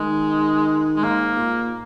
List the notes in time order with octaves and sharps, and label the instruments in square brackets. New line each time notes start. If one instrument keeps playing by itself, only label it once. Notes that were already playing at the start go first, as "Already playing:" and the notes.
Already playing: [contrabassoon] D#3 [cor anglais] G#3
[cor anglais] G#3
[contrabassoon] G#2 [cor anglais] A#3
[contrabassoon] A#2